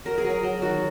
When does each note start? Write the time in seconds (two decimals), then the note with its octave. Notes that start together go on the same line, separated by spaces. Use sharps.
0.05 F#3 A#4
0.18 G#4
0.24 F#3
0.30 A#4
0.43 F#3
0.62 D#3 F#4